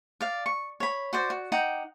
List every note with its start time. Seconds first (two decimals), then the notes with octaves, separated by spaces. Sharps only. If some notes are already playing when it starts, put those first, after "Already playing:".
0.21 D5 F5
0.46 C#6
0.80 C#5 B5
1.13 F#4 C5 D5
1.30 F#4
1.52 D#4 F#5 G5 D6